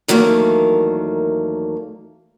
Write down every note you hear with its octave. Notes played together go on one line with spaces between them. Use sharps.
E2 D#3 F#3 A3 A#3